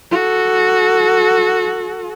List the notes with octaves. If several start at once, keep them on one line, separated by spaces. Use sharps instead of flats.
F#4 A4